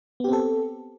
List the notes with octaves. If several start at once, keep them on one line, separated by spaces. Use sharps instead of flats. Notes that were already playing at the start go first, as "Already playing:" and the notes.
B3 C4 G4 A4